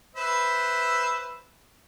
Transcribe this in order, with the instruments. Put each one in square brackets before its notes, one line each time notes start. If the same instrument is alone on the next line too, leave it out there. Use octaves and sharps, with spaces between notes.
[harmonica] B4 C5 E5